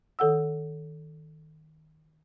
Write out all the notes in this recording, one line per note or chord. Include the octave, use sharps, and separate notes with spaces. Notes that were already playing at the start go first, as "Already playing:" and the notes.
D#3 A4 F#5 E6